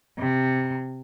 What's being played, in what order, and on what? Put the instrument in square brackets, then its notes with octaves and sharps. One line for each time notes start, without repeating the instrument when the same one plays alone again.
[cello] C3